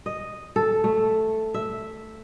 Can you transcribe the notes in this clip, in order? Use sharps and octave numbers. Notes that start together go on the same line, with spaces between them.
D#5
A4
A3
E5